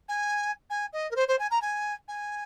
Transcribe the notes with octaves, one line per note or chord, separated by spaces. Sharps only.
G#5
G#5
D#5
A#4
C5
C5
G#5
A#5
G#5
G#5